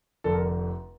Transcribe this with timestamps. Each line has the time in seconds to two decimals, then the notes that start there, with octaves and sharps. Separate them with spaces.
0.24 F1 F2 D3 A4
0.33 A#4